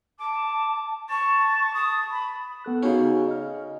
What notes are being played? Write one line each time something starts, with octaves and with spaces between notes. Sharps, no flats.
A5 D6
A5 C#6
D#6
B5
B3 A4 F#6
C#3 C#4 D#4 F#4
D#5 F6